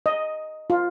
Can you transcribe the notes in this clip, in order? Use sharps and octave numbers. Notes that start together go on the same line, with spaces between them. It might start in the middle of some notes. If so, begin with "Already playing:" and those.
D#5
F4